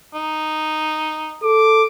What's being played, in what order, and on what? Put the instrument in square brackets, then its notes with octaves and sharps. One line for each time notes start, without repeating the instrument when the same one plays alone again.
[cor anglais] D#4
[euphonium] A4 [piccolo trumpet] D6